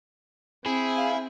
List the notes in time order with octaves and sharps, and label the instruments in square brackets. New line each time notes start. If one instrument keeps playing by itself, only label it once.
[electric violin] C4 [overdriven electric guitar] E4 [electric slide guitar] G#4
[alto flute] F5